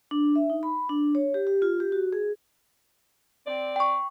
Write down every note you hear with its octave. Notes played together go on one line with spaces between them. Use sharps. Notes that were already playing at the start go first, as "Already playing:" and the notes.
D4
E5
D#4
B5
D4
C#5
G4
G4
F4
G4
F#4
G#4
C4 D5
G5 C#6